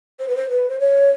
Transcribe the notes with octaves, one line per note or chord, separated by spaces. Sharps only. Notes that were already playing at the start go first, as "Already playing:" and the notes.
C5
B4
C5
B4
C5
C#5